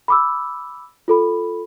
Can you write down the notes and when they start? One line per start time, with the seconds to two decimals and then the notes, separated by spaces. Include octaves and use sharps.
0.08 B5 D6 E6
1.08 F4 A4 B5